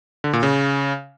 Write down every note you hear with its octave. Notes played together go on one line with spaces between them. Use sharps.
D3
A#2
C#3